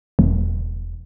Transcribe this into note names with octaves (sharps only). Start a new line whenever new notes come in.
E1